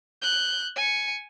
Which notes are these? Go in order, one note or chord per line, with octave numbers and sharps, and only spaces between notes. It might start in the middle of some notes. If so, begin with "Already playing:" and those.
F#6 G6
G#5 C#7